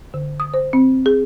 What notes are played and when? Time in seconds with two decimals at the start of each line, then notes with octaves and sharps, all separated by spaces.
0.14 D3
0.40 D#6
0.54 C5
0.73 C4
1.06 G#4